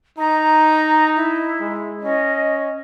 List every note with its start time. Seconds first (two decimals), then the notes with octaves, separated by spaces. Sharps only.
0.18 D#4 A#5
1.16 E4
1.60 G#3
2.03 C#4 D#5